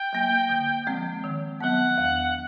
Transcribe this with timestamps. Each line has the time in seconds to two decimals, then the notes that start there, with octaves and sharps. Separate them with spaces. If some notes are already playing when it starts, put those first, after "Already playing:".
Already playing: G5
0.13 F#3 A#3
0.49 D3
0.87 F3 G#3 C4
1.24 D#3
1.60 F#3 B3 F#5
1.98 E2